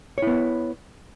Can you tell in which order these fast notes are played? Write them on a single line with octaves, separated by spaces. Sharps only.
C#5 E4 B3